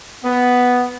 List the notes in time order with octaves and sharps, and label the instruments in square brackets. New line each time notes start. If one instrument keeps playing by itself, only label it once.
[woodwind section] B3